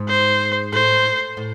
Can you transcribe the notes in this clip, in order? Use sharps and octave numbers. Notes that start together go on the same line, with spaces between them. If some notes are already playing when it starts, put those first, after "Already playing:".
Already playing: G#2
C5
A2 C5
A2